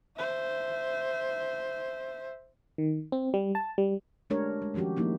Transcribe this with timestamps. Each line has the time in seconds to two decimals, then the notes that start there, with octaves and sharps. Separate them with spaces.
0.17 C5 E5
2.78 D#3
3.12 C4
3.34 G3
3.55 A5
3.78 G3
4.30 G#3 A3 D4 G4 A#4 C#5
4.62 G#3
4.74 D#3 F3 C#4 F#4 G4
4.96 F3 A3 A#3 D#4 E4